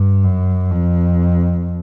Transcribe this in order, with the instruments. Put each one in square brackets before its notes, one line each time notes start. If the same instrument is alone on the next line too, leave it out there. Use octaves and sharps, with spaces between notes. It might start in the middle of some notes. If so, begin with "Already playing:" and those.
Already playing: [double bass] G2
F#2
F2